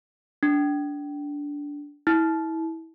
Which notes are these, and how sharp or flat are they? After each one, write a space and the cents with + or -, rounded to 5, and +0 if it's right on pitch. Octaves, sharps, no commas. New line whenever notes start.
D4 -15
E4 -25